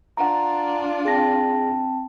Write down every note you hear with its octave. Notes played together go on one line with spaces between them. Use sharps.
D4 F4 F#5 A#5
C4 G#4 G5 A5 A#6